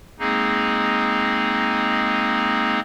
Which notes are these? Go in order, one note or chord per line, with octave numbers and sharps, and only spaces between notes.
G#3 A#3 C4 D#4 G#4